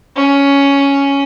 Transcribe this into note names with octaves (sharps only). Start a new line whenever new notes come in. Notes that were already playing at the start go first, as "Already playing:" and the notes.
C#4